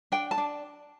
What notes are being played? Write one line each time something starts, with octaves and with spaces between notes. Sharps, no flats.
D4 G5
A5
D4